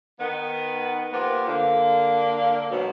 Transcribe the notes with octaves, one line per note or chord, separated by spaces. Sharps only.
D#3 B3
F3 A#3 B3 F4 G4
D3 A#3
G#2 B2 F#3